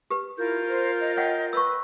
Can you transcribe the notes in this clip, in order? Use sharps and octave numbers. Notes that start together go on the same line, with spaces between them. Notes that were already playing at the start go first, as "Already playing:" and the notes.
G4 B4
E4 F4 A#4 G6
C5
D#5
C#5 D#5 F#5 G5
B4 C#6 E6